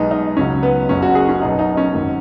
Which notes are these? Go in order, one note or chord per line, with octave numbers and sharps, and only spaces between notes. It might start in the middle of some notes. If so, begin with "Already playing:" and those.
Already playing: B1 B2 G#3 D#4
D#4
C#2 C#3 F#3 C#4
B3
F#1 F#2 F#3 C#4
F#4
G#4
C#4
B1 B2 F#3 D#4
D#4
C#4
G#1 F#2 D#3 F#3